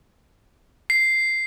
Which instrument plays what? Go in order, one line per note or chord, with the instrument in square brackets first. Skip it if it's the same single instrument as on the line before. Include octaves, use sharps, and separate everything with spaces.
[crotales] C7